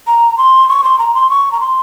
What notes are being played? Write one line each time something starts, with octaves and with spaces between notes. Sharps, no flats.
A#5
C6
C#6
C6
A#5
C6
C#6
A#5
C6